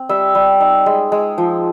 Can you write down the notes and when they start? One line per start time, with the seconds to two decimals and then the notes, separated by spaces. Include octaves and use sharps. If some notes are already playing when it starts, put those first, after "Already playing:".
Already playing: C4
0.09 G3 E5
0.35 G3
0.61 D#4
0.86 G#3
1.12 G#3
1.38 F3